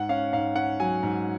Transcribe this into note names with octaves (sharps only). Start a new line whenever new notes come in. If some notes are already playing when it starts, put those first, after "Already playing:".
Already playing: G#2 F#5
C#4 F5
G#2 F5
C#4 F#5
F#3 G#5
G#2